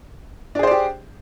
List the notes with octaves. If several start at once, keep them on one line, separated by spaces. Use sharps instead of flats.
D4 G4 G#4 C5 D5